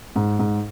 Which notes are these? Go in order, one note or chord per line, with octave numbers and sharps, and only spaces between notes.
G#2
G#2